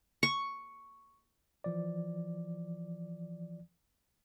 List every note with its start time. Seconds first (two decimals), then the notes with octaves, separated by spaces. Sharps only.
0.23 C#6
1.64 E3 F3 D5